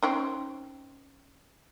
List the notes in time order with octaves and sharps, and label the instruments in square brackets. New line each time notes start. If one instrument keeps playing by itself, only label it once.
[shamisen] C4 C#4 D#4